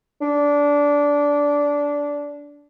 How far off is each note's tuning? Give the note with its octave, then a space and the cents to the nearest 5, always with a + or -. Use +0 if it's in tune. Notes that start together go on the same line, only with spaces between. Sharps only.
D4 -15